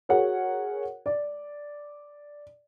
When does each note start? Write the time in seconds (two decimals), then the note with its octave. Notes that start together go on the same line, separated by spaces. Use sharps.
0.09 F#4 G#4 A#4 C#5 F#5
1.06 D5